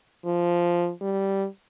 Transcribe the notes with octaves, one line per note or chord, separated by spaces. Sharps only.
F3
G3